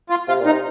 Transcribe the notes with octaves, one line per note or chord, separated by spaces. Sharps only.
F4
C3 F4
A#2
D#4
C3